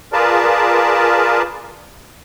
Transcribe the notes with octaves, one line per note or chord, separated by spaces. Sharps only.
F4 G#4 A#4 B4 D5 A5